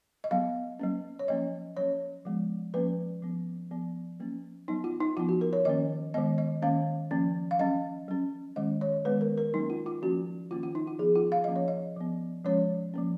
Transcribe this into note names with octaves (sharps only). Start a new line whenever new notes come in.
D#5
F#3 B3 F5
F#3 A#3 C#4
C#5
F3 A#3 C#4 D#5
F#3 A#3 C#4 C#5
F3 G#3 B3
F3 A#3 C#4 B4
F3 B3
F3 B3
F#3 A#3 C#4
F#3 B3 D#4
F4
D#4
F3 B3 F4
F#4
A#4
C#5
D#3 A#3 C#4 D#5
D#3 G#3 B3 D#5
D#5
D#3 A#3 C#4 F5
F3 A#3 C#4
F5
F#3 C#4 D#5
F#3 C#4
D#3 G#3 C#4 D#5
C#5
D#3 G#3 B3 B4
A#4
A#4
F#3 A#3 C#4 D#4
F4
F4
F3 A#3 C#4 F#4
D#3 A#3 C#4 F4
F4
D#4
F4
F3 B3 G#4
F4
F5
F3 A#3 C#4 D#5
C#5
D#5
F3 B3
F3 G#3 C#4 C#5
F3 A#3 C#4